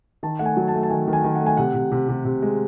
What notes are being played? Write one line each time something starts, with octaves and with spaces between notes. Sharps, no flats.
D#3 A5
A3 F#5
G#5
F#3
A5
A3
A5
D#3 G#5
D#3
G#5
D#3
F#5
A3
G#5
C3 F#5
C3
C3
C3
C3
G#3